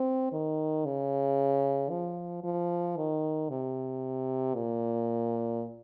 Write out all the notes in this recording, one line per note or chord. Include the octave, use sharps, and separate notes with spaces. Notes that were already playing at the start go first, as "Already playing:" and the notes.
Already playing: C4
D#3
C#3
F3
F3
D#3
C3
A#2